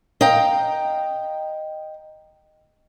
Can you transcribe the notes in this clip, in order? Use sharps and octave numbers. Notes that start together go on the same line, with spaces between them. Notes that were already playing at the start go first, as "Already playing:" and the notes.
D#5 F5 G5 A#5